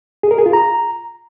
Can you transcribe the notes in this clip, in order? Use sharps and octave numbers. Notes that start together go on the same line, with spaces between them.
G#4
A#4
G#4
F4
A#5